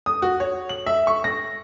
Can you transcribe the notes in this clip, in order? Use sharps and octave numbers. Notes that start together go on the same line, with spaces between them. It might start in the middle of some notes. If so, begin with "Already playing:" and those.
D#6
F#4
C#5
F#7
E5
C#6
A#6